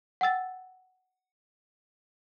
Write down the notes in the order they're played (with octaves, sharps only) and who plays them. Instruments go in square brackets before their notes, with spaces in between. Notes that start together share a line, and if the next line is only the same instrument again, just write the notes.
[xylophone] F#5 G5 E6 A6